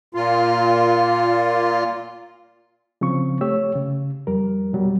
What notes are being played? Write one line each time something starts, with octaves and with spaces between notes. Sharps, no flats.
A#2 F4
C#3 F3 C4 C#6
A3 G4 C#5 E6
C#3
F2 G3 A#4
B2 F#3 G3